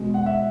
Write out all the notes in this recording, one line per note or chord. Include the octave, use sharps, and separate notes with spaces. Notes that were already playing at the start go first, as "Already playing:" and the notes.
Already playing: B2 G#3
F#5
E5